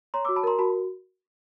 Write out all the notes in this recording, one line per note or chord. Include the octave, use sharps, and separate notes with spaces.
C#5 A#5 C6
D6 E6
F#4
A5 B5
A#4 A#5 C6
F#4 A5 B5